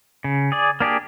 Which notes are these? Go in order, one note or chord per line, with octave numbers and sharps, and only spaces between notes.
C#3
G#4 D5
A#3 D4 G4 G#4